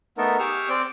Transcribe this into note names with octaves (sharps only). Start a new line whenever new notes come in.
A3 B3 D#4 A4 A#4
G4 G#4 C#6 E6 F6
C4 D5 G5